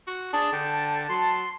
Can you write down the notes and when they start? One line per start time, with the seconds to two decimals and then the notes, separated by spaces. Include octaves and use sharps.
0.08 F#4
0.33 D4 G#4 A5
0.53 D3 G5
1.09 F#3 C6